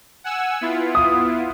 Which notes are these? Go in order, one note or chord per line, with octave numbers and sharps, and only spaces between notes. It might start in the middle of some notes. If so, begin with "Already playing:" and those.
F#5 G#5 E6
B3 E4 F4
D#6